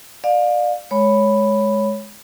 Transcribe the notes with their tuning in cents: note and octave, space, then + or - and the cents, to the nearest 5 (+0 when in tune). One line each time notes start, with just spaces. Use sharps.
D5 +25 F5 +25
G#3 +10 C#5 +0 B5 +0